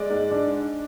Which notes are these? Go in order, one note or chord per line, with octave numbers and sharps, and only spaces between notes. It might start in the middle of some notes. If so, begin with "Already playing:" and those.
Already playing: G#3 D5
G#2
D4